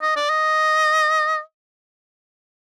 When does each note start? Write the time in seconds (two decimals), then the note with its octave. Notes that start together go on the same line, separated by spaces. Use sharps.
0.02 D#5
0.16 D5
0.30 D#5